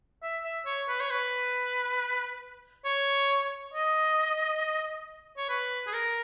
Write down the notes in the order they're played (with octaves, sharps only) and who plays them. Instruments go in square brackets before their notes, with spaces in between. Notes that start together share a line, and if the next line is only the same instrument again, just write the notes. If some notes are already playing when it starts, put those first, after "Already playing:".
[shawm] E5
E5
C#5
B4
C#5
B4
C#5
D#5
C#5
B4
G#4
A#4